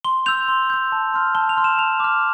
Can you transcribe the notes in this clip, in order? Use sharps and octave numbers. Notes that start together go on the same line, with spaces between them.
C6 G7
E6 G6 F7
C6
E6 G6
A5
C6 F6
A5 G7
F7
C6 F6
E7
A5 F7
D6 F6